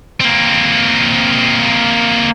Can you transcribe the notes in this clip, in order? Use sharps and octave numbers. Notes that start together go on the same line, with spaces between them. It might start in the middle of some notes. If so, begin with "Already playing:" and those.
A#3 C4